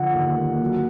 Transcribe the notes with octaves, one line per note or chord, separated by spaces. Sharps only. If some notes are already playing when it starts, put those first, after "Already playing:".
Already playing: D3 F3 F#5
D#2
A#3
F#3